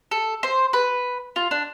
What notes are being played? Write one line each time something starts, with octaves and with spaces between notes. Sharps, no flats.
A4
C5
B4
F4
D4